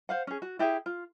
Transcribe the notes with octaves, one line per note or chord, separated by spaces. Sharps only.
C5 F5 F#5
C#4 G#4
F#4
E4 G4 G#4 E5
F4